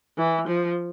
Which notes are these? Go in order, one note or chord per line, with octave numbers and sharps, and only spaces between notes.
E3
F3